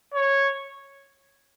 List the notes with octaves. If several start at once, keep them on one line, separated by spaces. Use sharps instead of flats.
C#5